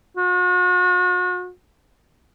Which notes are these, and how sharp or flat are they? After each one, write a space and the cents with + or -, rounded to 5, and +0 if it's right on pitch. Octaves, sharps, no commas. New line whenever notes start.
F#4 -40